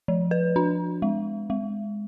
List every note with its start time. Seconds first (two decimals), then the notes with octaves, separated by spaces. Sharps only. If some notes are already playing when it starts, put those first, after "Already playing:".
0.08 F3
0.31 B4
0.56 D4
1.02 G#3
1.50 G#3